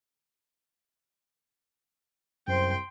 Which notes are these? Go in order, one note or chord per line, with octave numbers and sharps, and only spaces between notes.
C2 F#2 C5 G5 C6